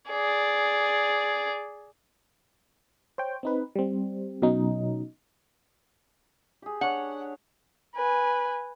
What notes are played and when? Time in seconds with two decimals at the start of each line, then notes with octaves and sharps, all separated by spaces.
0.10 G#4 D5
3.18 C5 C#5 G5
3.43 C4 D#4 B4
3.75 G3 C4
4.42 B2 F#3 C#4 D#4
6.62 G4 G#4
6.81 D4 C#5 F#5
7.94 B4 G#5